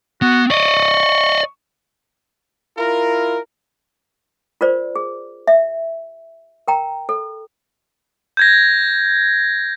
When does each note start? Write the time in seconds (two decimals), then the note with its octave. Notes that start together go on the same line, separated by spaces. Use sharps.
0.22 B3 F#4
0.50 D5 D#5 C#6
2.78 E4 F4 A#4
4.61 F4 A#4 C5 D5
4.96 G#4
5.48 E5
6.68 A#4 G5 A#5
7.09 A4
8.37 G6 G#6 A#6